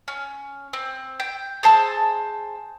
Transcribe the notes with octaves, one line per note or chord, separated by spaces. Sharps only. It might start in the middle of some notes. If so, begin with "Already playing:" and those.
C#4
C4
G5
G#4 C5 A5 E6